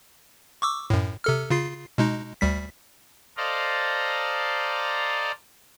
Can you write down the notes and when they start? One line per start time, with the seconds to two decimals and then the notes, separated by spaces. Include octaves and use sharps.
0.62 C#6 D6 E6
0.90 F#2 A2
1.24 C3 A4 F6
1.50 C#3 F4 C7
1.98 B2 G#3 D#4
2.41 D2 G3 B6
3.37 A4 C5 D5 D#5 F5 A#5